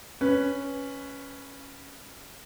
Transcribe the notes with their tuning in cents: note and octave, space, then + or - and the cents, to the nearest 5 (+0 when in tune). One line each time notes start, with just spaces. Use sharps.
C#4 +0 B4 +0